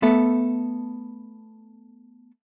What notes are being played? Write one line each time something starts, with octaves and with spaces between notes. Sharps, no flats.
A3 B3 A4 E5